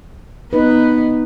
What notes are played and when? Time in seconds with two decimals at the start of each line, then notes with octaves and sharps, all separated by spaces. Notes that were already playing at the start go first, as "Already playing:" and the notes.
0.53 B3 D#4 B4